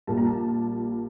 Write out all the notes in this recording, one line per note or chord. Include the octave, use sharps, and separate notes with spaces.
A#1 A#2 G3 A#3 A5
A#5
A5